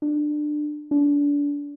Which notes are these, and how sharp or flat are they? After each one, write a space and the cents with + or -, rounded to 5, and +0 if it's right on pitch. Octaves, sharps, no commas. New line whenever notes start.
D4 +20
D4 -30